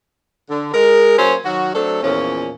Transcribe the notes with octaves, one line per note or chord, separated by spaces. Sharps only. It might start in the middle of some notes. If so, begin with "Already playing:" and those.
D3
G#3 A#4
F#3 A#3 C#4 C5
D#3 F#3 F#4
F#3 A3 C4 D4 A4
E2 A#2 F3 C#4